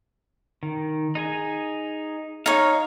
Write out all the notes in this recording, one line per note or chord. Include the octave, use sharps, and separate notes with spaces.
D#3
D#4 G#4 G#5
D#4 C#5 F5